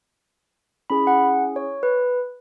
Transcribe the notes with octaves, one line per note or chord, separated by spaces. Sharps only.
C#4 E4 G#4 B5
F#5
C#5
B4